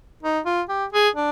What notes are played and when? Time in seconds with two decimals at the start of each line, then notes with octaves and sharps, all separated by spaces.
0.23 D#4
0.46 F4
0.69 G4
0.93 G#4
1.16 D4